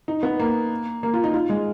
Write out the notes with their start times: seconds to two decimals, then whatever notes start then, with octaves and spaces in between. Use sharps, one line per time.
0.08 D#4
0.23 B3
0.40 A#3
1.03 A#3
1.14 F4
1.24 D#4
1.34 F4
1.49 G#3